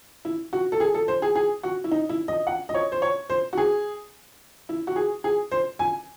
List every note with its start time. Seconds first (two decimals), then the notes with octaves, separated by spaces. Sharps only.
0.25 E4
0.53 F#4
0.72 A4
0.80 G#4
0.94 A4
1.08 C5
1.22 G#4
1.35 G#4
1.63 F#4
1.84 E4
1.92 D#4
2.09 E4
2.28 D#5
2.47 F#5
2.69 D#5
2.74 C#5
2.92 C5
3.02 C#5
3.30 C5
3.53 F#4
3.58 G#4
4.69 E4
4.87 F#4
4.96 G#4
5.24 G#4
5.52 C5
5.79 G#5